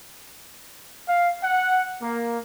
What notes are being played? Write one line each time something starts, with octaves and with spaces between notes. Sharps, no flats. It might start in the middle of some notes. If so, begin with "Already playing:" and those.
F5
F#5
A#3